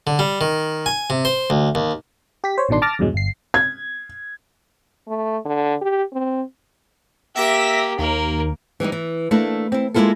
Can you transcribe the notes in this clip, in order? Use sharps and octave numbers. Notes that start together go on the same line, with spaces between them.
D3
G3
D#3
G#5
C3
C5
D2
D#2
G4 B6
C5 C#5
A1 B2 D#3 D4 C6
A5 D6 F6 A6 A#6
E2 G2 B2 F#3 G#3
G1 C7
G#6
A3
D3
G4
C4
A#3 G4 E5 A#6 B6
D#2 A#3 A#4
E3 G3 C#4 D#4
E3
A3 A#3 D4 E4
C4 E4
G#3 A#3 B3 E4 F4 A4